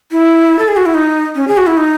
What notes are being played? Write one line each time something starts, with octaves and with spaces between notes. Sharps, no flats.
E4
A4
G#4
F#4
E4
D#4
C#4
G#4
F#4
E4
D#4